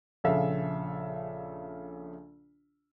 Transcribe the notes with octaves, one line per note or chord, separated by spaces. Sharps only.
A#1 C#3 A4 E5 F5